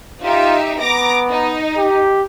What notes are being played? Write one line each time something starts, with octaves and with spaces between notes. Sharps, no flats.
D#4 F4 G4 E5
B3 A#5 D6 A#6
D#4
G4